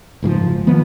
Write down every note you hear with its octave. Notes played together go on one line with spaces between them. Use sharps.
F#1 G#2 C#3 F3
D#3 F3 B3